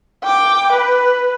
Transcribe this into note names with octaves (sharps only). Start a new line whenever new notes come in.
G5 D6
B4